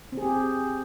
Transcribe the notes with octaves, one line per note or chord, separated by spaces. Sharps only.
C4
G#4
G4